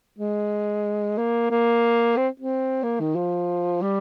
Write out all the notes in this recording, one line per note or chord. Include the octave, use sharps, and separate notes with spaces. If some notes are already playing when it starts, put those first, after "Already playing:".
G#3
A#3
A#3
C4
C4
A#3
D#3
F3
G3